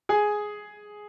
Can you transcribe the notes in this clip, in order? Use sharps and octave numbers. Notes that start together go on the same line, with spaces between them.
G#4 G#5